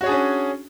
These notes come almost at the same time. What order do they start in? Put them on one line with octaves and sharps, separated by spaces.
F#4 C#5 G#4 D4 C#4